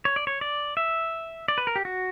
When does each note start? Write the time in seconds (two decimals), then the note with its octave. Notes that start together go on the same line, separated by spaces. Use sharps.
0.05 C#5
0.16 D5
0.27 C#5
0.41 D5
0.77 E5
1.48 D5
1.58 B4
1.67 A#4
1.76 G4
1.85 F#4